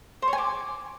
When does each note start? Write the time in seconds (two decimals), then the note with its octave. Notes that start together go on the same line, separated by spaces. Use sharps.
0.22 C5
0.28 C#5
0.33 G#5
0.38 D6